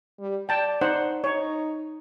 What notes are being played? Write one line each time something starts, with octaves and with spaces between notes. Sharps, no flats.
G3
D5 G5 A5
D#4 C5 F#5
D#4 C#5